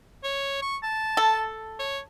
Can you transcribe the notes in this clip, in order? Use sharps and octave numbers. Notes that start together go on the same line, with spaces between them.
C#5
C#6
A5
A4
C#5